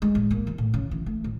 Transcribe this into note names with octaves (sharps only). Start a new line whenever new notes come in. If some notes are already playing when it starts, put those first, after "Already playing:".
G#3
A1
A#3
E2
A2
C#3
E3
A3
A1